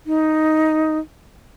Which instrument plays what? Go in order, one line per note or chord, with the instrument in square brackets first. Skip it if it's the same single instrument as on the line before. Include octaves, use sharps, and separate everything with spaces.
[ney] D#4